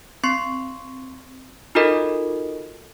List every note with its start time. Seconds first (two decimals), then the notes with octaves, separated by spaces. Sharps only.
0.24 C4 C6 C#6 C7
1.75 D#4 F4 F#4 A4 A#4 D#5